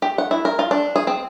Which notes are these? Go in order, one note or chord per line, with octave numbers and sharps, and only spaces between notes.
G4
F#5
E4
A#4
F4
D4
G#4
C4